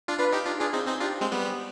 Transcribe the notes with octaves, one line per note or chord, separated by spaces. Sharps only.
D4 F4
D4 F4 B4
D#4 G4
D4 F4
D4 F4 G#4
C4 D#4
C4 D#4
D4 F4 G4
G#3 C4
G3 B3